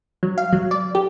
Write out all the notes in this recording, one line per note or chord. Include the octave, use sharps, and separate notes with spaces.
F#3
F5
F#3
D5
G4